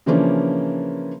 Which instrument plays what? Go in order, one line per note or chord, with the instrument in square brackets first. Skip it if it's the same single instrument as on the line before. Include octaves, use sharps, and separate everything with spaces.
[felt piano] C#3 E3 F3 A#3 C#4 D4